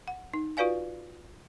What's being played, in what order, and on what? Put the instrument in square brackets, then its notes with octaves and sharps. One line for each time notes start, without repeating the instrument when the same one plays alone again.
[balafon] F#5
D#4
F4 F#4 B4 D5 F5 G#5